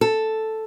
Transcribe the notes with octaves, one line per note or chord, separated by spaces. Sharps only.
A4